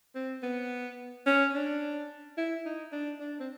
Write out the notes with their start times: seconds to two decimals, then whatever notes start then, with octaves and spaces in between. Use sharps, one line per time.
0.15 C4
0.43 B3
1.26 C#4
1.54 D4
2.38 E4
2.65 D#4
2.92 D4
3.20 D4
3.40 C4